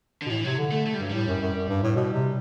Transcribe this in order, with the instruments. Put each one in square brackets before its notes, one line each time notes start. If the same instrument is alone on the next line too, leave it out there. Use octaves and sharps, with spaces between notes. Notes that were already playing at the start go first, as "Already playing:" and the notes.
[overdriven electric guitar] D3
[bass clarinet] B2
[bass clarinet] A2 [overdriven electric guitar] E3
[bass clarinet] C3 [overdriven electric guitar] F#3
[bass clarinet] D3
[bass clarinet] D3 [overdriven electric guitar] A3
[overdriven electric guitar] A3
G3
[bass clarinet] G2 [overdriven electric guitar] F#3
[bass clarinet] A2 [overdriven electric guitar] G3
[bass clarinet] F#2
F#2
F#2
G2
A2
B2
C3